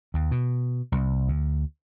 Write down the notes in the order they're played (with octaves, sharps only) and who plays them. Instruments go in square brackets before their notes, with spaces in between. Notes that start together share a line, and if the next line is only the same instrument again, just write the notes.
[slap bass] D#2
B2
C2
D2